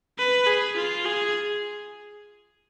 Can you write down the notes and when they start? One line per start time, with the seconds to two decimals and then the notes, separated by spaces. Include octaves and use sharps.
0.19 B4
0.47 G#4
0.76 F4
1.05 G#4